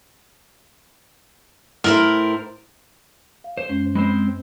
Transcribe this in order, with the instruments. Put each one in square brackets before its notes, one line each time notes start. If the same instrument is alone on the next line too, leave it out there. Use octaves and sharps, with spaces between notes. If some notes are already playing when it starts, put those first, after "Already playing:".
[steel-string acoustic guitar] A2 E4 C5 [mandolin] A#4
[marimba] F5
[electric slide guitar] C5
[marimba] F#2 G#3 C#4
[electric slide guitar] G#3 C4 C5 [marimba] B5